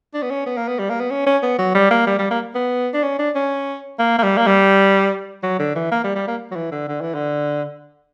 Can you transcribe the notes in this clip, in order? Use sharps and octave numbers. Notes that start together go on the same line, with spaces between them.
D4
B3
C#4
B3
A#3
B3
G3
A#3
B3
C#4
C#4
B3
F#3
G3
A#3
G3
G3
A#3
B3
D4
C#4
D4
C#4
A#3
A#3
G3
A#3
G3
F#3
D3
E3
A#3
G3
G3
A#3
F#3
E3
D3
D3
E3
D3